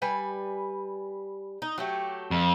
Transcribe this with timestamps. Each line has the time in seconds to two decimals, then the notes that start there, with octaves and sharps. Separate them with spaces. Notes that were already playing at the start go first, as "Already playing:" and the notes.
0.02 G3 B4 G#5
1.62 D#4
1.78 F#3 A3 G4
2.31 F2